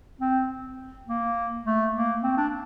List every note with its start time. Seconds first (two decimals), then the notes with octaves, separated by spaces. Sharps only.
0.21 C4
1.08 A#3
1.65 A3
1.95 A#3
2.23 C4
2.37 D4